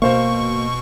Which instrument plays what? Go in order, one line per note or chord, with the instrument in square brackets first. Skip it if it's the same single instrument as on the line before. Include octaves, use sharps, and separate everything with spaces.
[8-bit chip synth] B2 C#6 [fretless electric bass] A#3 [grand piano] C5 F5